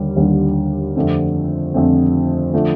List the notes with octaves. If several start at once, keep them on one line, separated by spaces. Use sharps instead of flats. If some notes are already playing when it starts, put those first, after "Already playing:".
Already playing: D#2 D3 G3
D#2 D3 G3
F2 D3 A3 C4
F2 D3 A3 C4
D3 F3 A3